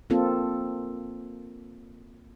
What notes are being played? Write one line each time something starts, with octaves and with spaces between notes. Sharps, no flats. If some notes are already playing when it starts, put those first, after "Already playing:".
A#3 C4 F4 A4